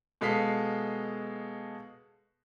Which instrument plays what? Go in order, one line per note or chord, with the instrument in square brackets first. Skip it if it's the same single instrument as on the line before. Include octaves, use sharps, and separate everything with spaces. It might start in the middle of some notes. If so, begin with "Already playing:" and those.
[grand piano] B2 G#3 A4 F5 B6 C7